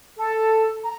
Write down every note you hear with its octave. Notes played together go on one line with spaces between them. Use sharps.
A4
A#5